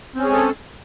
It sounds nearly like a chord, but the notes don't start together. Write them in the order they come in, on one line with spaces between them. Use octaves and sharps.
C4 C#4 G#4 G#3 A4